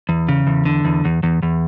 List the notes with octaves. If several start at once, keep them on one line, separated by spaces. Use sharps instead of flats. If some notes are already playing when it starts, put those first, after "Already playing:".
E2
C#3
E2
D3
E2
E2
E2
E2